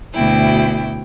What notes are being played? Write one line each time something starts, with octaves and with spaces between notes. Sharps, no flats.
D2 B2 E4 G5